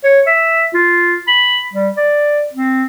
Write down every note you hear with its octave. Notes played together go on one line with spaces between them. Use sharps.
C#5
E5
F4
B5
G3
D5
C4